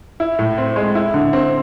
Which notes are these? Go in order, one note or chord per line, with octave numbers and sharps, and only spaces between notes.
E4
A2
C4
G#3
E4
D3
C4